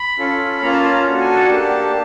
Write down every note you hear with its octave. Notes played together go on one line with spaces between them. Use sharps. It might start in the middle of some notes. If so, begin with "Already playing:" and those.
Already playing: B5
C#4 F4 A4
A#3 C#4 F4 A#5
A5
A5
A#5
D4 F#4 A4
G#5
A5
A#3 D4 G4